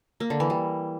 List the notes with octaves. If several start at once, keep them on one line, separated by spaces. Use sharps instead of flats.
A#3
D3
E3
G3